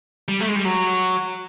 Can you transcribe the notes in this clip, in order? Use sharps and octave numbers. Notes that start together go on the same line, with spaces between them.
G3
A3
G#3
G3
F#3